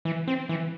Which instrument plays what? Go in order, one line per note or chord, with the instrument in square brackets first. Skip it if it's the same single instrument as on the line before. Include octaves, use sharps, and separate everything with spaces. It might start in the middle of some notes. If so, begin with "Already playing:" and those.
[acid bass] E3
C4
E3